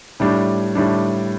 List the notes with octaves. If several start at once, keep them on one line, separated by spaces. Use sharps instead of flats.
A2 G3 D4
A2 G3 D4